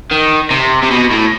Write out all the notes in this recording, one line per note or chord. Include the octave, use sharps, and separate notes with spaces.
D#3
C3
C3
B2
A2